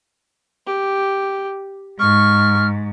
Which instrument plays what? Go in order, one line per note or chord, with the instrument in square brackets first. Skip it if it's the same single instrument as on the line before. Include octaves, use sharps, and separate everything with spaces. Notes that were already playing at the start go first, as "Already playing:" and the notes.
[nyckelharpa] G4
[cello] G#2 [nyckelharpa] C#6 [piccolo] F6